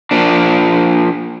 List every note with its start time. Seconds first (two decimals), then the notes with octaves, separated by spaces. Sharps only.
0.11 F3 A#3 D4